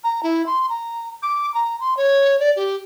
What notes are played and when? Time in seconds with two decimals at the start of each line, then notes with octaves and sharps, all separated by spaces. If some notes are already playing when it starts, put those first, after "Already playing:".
0.04 A#5
0.23 E4
0.47 C6
0.69 A#5
1.23 D6
1.54 A#5
1.80 C6
1.97 C#5
2.40 D5
2.56 G4